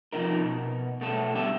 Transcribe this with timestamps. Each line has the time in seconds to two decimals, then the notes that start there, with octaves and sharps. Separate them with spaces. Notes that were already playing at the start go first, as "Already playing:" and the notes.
0.13 C3 F3 D#4 A#4
0.40 B2
1.01 B2 A3 A4
1.35 D3 G3 B3 G4 A4 E5